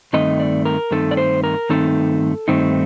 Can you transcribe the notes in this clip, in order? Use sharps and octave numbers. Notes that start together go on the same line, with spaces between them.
G2 D#3 A3 C4 D#4 D#5
D5
A#4
G2 D#3 A3 C4 D#4 A4
D5
C5
A#4
G2 D#3 A3 C4 D#4 A4
G2 D#3 A3 C4 D#4